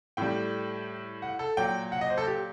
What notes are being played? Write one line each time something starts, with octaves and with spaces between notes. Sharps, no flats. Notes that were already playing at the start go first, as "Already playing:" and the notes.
A2 G3 G5
F#5
A4
A#2 F#3 G5
F#5
D#5
C5
A4
G4